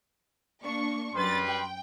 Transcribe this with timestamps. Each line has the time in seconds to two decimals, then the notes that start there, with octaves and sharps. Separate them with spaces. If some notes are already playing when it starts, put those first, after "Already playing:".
0.63 A#3 D4 C#6
1.15 F#2 G3 B4 C6 A6
1.47 G5